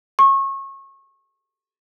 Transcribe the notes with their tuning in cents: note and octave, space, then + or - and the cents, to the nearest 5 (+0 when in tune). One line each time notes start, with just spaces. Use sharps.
C#6 -25